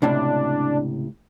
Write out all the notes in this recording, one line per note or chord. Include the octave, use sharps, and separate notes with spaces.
C#2 A2 C3 D4